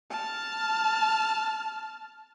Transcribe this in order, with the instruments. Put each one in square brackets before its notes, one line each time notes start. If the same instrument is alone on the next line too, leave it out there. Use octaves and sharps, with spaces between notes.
[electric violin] A5 F6